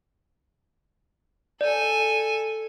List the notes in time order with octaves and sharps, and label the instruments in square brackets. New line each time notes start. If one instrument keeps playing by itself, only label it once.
[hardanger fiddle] A4 G#5 [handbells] D5